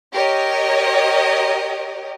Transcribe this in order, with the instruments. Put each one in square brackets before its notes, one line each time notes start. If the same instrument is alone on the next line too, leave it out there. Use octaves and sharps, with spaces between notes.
[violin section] G4 A#4 C#5 D#5